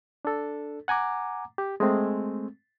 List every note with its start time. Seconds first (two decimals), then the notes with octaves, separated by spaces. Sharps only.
0.25 D4 A4
0.88 F#5 G#5 A#5 D6
1.58 G4
1.80 G#3 A3 C4